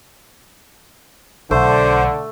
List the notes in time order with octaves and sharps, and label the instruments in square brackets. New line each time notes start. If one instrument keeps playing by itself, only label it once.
[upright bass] B1 [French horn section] D3 [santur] A3 [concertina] C5